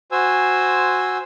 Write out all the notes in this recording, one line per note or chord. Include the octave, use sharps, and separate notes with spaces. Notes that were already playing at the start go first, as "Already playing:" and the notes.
F#4 C5 G#5 E6